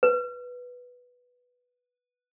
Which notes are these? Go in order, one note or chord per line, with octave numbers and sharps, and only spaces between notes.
B4